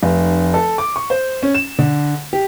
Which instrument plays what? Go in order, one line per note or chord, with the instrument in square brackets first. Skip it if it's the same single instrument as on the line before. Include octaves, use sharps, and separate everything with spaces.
[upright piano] F1
A4
D6
C#6
C5
C#4
E7
D3
G4